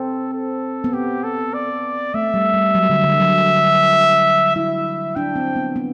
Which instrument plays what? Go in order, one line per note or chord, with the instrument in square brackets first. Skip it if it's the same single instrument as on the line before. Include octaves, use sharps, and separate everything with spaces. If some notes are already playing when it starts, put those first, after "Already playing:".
Already playing: [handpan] C4 [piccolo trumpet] A4
[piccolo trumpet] A4
[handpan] B3
[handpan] C4 [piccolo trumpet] G4
[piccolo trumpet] A4
D5
[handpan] A3 [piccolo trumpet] E5
[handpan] G3
G3
F#3
D3
D3
F#3
[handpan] E4 [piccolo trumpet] E5
[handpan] D4 [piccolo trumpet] G5
[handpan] C4
B3
B3